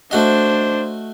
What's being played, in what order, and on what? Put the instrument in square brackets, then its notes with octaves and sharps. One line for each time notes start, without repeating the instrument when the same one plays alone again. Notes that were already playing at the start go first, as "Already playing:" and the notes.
[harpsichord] A3 F#4 D#5 [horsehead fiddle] D4 C5